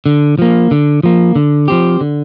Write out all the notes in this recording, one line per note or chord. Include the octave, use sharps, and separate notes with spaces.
D3
F3 A#3
D3
F3 A#3
D3
F3 C4 G4
D3